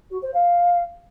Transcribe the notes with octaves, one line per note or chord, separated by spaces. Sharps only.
F#4
C5
F5